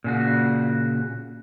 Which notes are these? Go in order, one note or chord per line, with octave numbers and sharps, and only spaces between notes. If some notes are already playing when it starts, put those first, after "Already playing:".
A#2 C#3 F#4